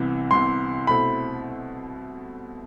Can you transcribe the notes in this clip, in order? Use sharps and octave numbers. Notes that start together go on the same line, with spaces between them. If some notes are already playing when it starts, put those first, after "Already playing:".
Already playing: C2 C3 E3 B3
C2 C3 E3 B3 C6
B2 A3 C4 E4 B5